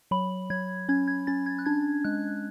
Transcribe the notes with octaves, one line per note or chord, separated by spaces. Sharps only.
F#3 B5
F#3 G#6
C#4 G#6
G#6
C#4 A6
G#6
F#6
D4 G#6
G#3 F#6